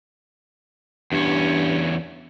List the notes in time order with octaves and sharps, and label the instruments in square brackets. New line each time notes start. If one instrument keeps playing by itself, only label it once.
[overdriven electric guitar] E2 C#4 [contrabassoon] G2